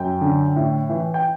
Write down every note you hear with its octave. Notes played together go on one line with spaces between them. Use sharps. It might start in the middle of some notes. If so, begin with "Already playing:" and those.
Already playing: F#2 G5
D3
A2
E3
G5